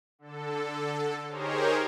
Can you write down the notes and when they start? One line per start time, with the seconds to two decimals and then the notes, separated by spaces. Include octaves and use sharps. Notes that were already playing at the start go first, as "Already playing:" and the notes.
0.19 D3 A4
1.28 D#4 G4 G#4 A#4 C5 C#5